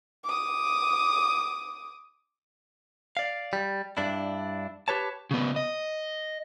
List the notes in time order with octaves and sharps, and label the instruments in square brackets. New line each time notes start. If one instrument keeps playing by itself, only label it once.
[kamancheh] D6 D#6
[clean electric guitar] D5 F5
G3
G2 D4 E4
G4 B4 C#5 A5
[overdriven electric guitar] C#3 B3
D#5